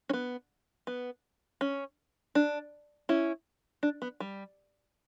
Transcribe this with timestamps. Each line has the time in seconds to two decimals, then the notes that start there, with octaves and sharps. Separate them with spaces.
0.09 C#4
0.13 B3
0.87 B3
1.61 C#4
2.35 D4
3.09 C#4 E4
3.83 D4
4.02 B3
4.20 G3